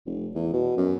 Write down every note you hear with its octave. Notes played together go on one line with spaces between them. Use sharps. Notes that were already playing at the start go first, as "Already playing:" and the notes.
F1
E2
B2
F#2